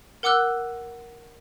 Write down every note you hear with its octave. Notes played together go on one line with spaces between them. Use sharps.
A#4 F#5 D6 E6 F#6